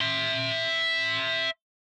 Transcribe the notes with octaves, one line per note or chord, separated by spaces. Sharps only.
E5 C6